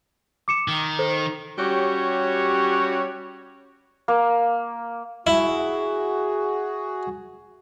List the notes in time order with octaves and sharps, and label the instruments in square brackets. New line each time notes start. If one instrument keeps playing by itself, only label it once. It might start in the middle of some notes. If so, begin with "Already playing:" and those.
[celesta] D6 C#7 E7
[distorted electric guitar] D#3
[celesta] A4 C5
[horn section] G3 C#4 F#4 G4 C#5
[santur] A#3
[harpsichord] E4 [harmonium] F#4 G#4